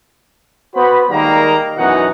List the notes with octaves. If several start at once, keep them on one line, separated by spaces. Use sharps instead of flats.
B3 F#4 C5 B5
D#3 G3 G#3 A#3 A#4 A#5
F#2 B2 E3 D#4 F#5